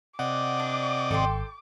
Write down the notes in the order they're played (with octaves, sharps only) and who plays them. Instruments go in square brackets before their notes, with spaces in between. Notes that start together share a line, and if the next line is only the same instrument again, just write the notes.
[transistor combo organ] C3 D5 D#5 [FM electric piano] F#5 [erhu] D6
[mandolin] D4
[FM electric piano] G#1 [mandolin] A4 G5 C6